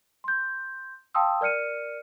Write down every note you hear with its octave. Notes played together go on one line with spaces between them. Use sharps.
C6 G6
F5 G5 A5 C6 D#6 E6
A#4 D5 F6 C#7 D#7